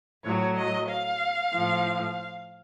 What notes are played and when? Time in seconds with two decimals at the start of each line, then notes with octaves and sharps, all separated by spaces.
0.24 A2 F#3 C#5
0.56 D#5
0.88 F5
1.52 A2 F3